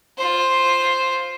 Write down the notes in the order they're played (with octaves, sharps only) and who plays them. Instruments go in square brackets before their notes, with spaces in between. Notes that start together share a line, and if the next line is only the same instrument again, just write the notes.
[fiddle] F4 C5